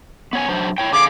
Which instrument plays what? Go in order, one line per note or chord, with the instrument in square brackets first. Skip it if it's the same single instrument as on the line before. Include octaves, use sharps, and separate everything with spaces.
[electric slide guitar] B3 C#5 G#5
F#3 D4 C5
E4 C#5 G5
[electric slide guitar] D3 G#4 F5 [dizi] D6